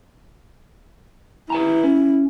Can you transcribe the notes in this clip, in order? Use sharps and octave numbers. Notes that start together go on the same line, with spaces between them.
E4 B4 G#5 A#5
C#4